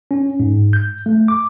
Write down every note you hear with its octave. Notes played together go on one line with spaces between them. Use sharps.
C#4
G#2
G6
A3
D6